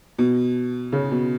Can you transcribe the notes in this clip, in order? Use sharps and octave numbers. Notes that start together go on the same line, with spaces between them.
B2
C#3
B2